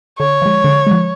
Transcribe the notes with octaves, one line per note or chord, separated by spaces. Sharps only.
D3 C#5
F3 G#3
D3
F3 G#3